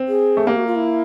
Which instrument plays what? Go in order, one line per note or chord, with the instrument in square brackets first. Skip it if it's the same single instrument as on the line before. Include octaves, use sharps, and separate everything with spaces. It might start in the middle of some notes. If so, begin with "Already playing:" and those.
Already playing: [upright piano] C4
[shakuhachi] G#4
[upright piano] A3
[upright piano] A#3 [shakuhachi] G4
[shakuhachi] F#4
F4
E4